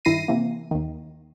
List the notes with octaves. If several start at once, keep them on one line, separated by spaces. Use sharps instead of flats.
G2 D#3 E4 A#6 C7 D#7
C3 E3 A#3
D#2 D#3